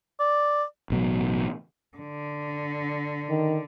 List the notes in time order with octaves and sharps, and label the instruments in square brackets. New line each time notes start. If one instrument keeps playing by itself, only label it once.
[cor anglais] D5
[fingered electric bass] A1 B2 F#3
[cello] D3
[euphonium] D#3